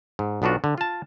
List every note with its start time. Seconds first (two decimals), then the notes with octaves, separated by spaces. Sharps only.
0.19 G#2
0.42 B1 B3 D4 F4 F#4
0.64 D3
0.78 F4 A5